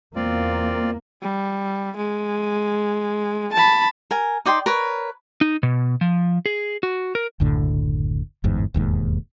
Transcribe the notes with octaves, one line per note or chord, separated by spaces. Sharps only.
E2 A#3 C4 F4 D5
G3
G#3
A5 B5
A#4 G#5
D#4 D5 G5 C6
A#4 B4 C#5
D#4
B2
F3
G#4
F#4
A#4
F#1 D2 A2 D3
G1 E2 G#2
E1 D#2 G#2